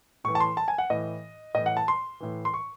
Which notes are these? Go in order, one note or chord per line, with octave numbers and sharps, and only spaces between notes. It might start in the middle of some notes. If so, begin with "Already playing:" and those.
A2 E3 C#6
A5
C6
A5
G#5
F#5
A2 E3 D#5
A2 E3 D#5
F#5
A5
C6
A2 E3
C6
C#6